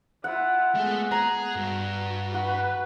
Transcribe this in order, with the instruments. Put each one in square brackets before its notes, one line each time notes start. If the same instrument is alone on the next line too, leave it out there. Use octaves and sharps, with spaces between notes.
[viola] E4 F4 [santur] F#5
[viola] G#3 B3 [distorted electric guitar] A3
[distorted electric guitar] G#4 [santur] A#5
[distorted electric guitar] G2 [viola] F#4
[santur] F#4 [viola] B4